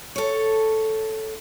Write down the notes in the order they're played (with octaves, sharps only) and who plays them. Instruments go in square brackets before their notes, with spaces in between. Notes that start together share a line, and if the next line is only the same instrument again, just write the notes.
[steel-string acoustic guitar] A4 C#5